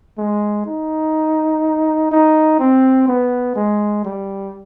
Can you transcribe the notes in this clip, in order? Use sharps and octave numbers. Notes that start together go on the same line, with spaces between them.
G#3
D#4
D#4
C4
B3
G#3
G3